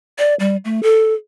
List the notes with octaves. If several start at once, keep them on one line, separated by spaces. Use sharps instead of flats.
D5
G3
A3
A4